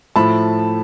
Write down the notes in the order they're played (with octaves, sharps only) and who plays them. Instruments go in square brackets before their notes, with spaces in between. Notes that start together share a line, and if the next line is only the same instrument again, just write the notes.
[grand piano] A2 F3 A3 A5 B5